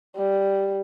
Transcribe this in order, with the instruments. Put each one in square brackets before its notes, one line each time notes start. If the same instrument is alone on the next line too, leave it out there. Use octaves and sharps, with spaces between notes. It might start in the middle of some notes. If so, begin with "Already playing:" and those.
[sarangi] G3